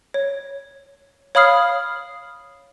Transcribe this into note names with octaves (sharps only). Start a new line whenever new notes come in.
C#5
C#5 F5 B5 D#6 F6 C7